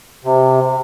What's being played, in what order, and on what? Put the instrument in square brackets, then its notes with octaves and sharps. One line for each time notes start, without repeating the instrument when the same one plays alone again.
[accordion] C3